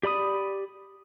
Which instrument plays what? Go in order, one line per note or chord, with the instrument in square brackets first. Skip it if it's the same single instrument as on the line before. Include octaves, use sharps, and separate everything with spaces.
[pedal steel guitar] G4 D5 B5 D#6